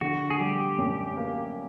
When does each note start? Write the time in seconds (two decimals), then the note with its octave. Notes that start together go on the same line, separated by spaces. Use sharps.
0.01 D3 F#4
0.30 G#4
0.39 G3 G4
0.78 F#2
1.17 A#3